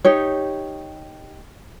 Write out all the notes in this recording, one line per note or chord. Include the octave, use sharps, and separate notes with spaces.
D#4 G4 C#5